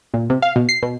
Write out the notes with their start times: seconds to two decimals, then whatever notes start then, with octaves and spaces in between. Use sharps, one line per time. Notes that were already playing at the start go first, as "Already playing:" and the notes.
0.14 A#2
0.30 C3
0.42 F5
0.56 B2
0.69 C7
0.83 B2